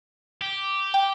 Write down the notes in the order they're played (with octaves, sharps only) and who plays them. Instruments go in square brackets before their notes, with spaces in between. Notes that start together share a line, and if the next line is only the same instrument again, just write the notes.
[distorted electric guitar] G4
[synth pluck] G5